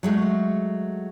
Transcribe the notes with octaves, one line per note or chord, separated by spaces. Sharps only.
F#3 G#3 A3